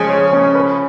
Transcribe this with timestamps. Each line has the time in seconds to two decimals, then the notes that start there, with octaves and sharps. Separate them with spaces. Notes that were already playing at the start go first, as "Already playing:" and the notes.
Already playing: C#3 F3 G#3 C#4 G#4
0.09 C#5
0.33 C#4
0.55 B4